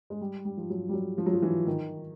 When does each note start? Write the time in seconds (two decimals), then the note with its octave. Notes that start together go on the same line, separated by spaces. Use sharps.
0.10 G#3
0.21 G3
0.45 G3
0.57 F3
0.70 F#3
0.89 G3
0.93 F#3
1.18 F3
1.26 F#3
1.33 F3
1.42 E3
1.67 D#3